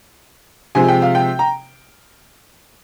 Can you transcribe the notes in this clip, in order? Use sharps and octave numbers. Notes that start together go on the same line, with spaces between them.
C3 F3 G#3 C4 G#5
G5
F5
G5
A#5